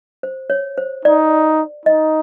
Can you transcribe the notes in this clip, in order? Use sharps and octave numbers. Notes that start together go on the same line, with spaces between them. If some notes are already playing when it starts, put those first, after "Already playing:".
C5
C#5
C5
D#4 D5
D#4 D#5